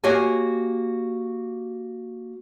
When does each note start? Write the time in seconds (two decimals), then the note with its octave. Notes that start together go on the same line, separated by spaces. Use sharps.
0.04 A#3 F#4 G4 C#5 D#5 G#5